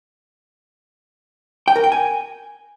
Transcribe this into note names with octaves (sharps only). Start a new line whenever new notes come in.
G5
A#4
G5
G#5